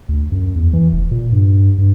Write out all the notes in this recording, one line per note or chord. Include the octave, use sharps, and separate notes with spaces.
D2
F#2
E2
E3
F1
A#2
G2
G2